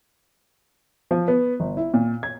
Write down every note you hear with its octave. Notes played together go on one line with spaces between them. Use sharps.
F3
B3
G1
E4
A#2
G#6